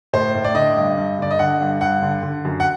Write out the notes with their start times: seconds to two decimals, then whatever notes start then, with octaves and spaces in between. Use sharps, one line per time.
0.13 A2 C5
0.35 A2
0.45 D5
0.55 D3 D#5
0.77 G2
0.98 G2
1.19 D3 D5
1.31 D#5
1.39 D3 F#5
1.61 G2
1.81 G2 F#5
2.02 D3
2.23 D3
2.45 F#2
2.60 F#5